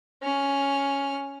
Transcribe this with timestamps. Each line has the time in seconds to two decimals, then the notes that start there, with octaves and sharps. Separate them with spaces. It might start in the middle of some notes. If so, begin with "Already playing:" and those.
0.23 C#4 F6